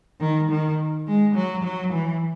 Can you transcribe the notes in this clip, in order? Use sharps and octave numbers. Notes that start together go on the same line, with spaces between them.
D#3
D#3
G#3
F#3
F#3
E3